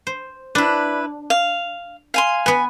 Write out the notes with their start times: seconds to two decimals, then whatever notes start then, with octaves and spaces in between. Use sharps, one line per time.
0.07 C5
0.55 D4 E4 B4
1.30 F5
2.14 F5 G#5 C6
2.46 B3 B4 G#5